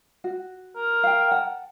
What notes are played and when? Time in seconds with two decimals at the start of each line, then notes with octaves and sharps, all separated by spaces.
0.24 F#4
0.76 A#4
1.03 F5 G5
1.31 F#5 A5